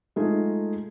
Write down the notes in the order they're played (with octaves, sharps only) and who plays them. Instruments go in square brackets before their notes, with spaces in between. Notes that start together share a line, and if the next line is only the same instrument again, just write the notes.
[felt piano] G#3 A3 D#4 F4 G#4